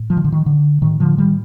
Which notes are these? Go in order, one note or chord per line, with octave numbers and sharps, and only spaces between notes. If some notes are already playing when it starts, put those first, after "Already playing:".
Already playing: A2
F3
D#3
D3
D#3
D3
A2 D#3
D3 F3
D#3 G3